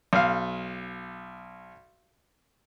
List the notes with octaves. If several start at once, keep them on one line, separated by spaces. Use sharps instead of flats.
B1 F5